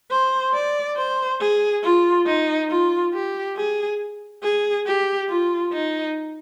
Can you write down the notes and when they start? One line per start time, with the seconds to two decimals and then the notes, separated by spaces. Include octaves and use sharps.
0.11 C5
0.54 D5
0.97 C5
1.41 G#4
1.84 F4
2.27 D#4
2.70 F4
3.14 G4
3.57 G#4
4.43 G#4
4.86 G4
5.29 F4
5.73 D#4